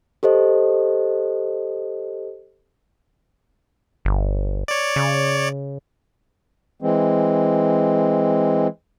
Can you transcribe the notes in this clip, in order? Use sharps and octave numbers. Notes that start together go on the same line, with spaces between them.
G4 A4 C5 D#5
G1
C#5 D5
C#3
E3 G#3 C4